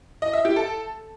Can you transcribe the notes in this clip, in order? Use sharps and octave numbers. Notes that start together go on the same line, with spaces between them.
D#5
E5
G4
A4